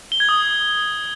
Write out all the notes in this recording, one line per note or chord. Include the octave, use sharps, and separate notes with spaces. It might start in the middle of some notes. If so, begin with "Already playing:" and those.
G7
G#6
D#6